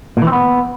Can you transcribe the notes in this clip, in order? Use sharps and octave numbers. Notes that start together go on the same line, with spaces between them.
A#2
E3
C4
B3